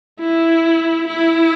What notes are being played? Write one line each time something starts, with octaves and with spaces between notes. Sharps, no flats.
E4
E4